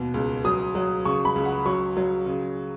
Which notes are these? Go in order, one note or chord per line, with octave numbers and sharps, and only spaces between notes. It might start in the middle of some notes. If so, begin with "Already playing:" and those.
Already playing: D#2 B2
C#2
F#3 D#6
F#3
C#3 C#6
B5
C#2
F#5
F#3 C#6
F#3
C#3